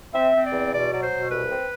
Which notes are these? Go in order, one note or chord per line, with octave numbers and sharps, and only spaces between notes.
C4 E5
C4
D5
E2
B2 D5
F#3 D5
C5
B2
C2 B4
C4